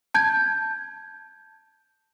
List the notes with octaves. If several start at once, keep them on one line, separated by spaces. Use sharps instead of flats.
A5 G6 G#6